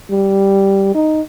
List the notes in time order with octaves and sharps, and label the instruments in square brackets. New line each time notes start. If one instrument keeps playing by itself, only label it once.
[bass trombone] G3
D#4